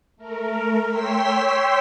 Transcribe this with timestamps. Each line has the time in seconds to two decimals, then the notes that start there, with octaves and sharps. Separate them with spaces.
0.16 A3 A#4
0.87 C#5 G5 C6 E6 B6